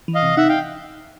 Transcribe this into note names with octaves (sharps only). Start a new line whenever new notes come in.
E3
D#5 F5
C3
D#4 E5 F#5
F5 G5